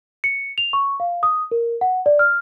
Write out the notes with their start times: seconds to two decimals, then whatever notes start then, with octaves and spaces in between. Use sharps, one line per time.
0.24 C#7
0.58 F7
0.73 C#6
1.00 F5
1.23 D#6
1.51 A#4
1.81 F#5
2.06 D5
2.19 F6